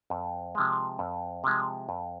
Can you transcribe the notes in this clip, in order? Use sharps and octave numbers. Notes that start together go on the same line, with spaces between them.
F2
C3 F3 G#3
F2
C3 F3 G#3
F2